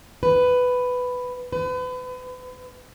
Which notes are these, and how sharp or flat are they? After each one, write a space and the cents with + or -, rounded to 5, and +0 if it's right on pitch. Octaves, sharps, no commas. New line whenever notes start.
B4 +10
B4 +35